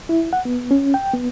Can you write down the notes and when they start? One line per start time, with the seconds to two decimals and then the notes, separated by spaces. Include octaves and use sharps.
0.09 E4
0.33 F#5
0.45 B3
0.71 C#4
0.94 G5
1.14 B3